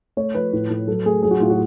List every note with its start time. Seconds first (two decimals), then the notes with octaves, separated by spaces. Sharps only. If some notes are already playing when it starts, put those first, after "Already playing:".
0.17 A3 C#5
0.35 F3 B4
0.53 A2
0.70 A2
0.87 F#3 A4
1.05 A3 G#4
1.23 F#3 G#4
1.31 F#4
1.40 A2 F4
1.50 F#4